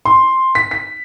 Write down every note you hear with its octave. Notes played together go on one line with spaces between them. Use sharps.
C6
B6
B6